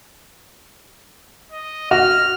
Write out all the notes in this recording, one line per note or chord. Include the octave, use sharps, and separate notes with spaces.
D#5
F#4 F6